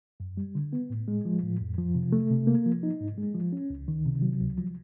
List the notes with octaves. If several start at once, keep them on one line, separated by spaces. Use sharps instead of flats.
F#2
G3
D3
B3
A2
G#3
F3
A2
F2
F3
C3
A3
C3
A#3
F3
D#4
G#2
G#3
F3
C#4
C#2
D#3
C3
F#3
C#2
F3